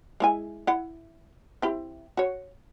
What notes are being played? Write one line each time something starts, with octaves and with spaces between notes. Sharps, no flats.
G#3 E4 G#5
E4 F#5
C4 E4 G4
F#4 C#5